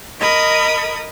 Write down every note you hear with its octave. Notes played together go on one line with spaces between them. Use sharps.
A#4 D#5 B5 D#6 G#6